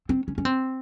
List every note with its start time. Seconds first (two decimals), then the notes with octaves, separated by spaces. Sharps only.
0.09 C4
0.28 C#4
0.38 C#4
0.45 C4